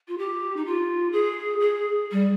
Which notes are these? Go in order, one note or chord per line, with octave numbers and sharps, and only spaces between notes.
F4
G4
D#4
F4
G#4
G#4
G3